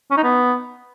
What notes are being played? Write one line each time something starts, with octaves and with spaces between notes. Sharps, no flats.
C#4
D#4
B3